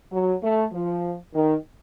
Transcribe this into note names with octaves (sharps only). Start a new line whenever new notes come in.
F#3
A3
F3
D#3